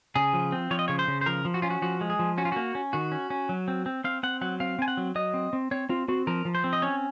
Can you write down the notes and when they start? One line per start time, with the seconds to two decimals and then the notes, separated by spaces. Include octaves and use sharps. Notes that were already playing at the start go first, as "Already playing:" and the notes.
0.16 C#3 G#4
0.33 F3
0.52 C4
0.71 F3 C#5
0.79 D#5
0.88 C#3 C#5
0.99 C5
1.08 C#3
1.21 C5
1.26 F3 A#4
1.45 F3
1.54 F#4
1.62 C#4 F4
1.70 F#4
1.82 F3 F#4
2.01 G#3
2.10 G#4
2.19 F3
2.38 C#4 F#4
2.45 F4
2.52 A#3 F#4
2.75 C#4
2.93 D#3 F#4
3.12 C#4
3.30 C#4
3.49 F#3
3.68 C4
3.86 C4
4.04 C4 F5
4.23 C4 F#5
4.41 F#3 F#5
4.60 C4 F5
4.79 C4 G#5
4.88 F#5
4.97 F#3
5.15 F#3 D#5
5.34 C4
5.53 C4
5.71 C4 C#5
5.89 C4 F4
6.08 C4 F#4
6.27 F3 A#4
6.45 F3
6.55 C5
6.64 C4
6.73 D#5
6.82 C#4 C#5